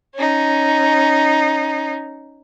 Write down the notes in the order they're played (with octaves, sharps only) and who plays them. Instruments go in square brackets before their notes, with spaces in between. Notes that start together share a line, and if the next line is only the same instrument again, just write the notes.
[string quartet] C#4 D#4